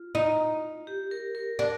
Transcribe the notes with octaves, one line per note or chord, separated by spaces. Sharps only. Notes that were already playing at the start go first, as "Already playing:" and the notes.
Already playing: F4
D#4
G4
A#4
A#4
D4 A#4